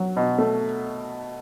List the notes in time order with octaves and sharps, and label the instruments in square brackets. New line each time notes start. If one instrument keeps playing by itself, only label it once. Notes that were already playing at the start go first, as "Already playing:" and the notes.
Already playing: [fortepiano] F#3
B2
A3